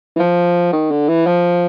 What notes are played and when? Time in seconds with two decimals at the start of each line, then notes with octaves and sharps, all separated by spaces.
0.16 E3
0.19 F3
0.73 D#3
0.91 D3
1.08 E3
1.26 F3